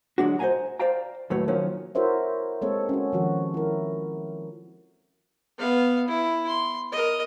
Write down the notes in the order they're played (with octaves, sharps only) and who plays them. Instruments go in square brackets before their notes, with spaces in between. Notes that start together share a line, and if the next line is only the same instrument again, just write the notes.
[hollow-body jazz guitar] D3 F#3 G#3 D4 F#4
C5 D#5 F5 F#5 G#5 A#5
C5 D5 F5 G5 A#5
D#2 A2 F#3 A3 B4 C#5
D#3 F3 F#3 A#3 C#4
[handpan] E4 F#4 A#4 C5 C#5 E5
G#3 A#3 C4 A4 C#5
C#4 F#4
D#3 F3 F#4
E4 A#4
[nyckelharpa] B3 F5
E4
C6
A#4 D#5